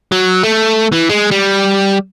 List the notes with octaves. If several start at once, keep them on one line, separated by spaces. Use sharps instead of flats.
F#3
A3
E3
G#3
G3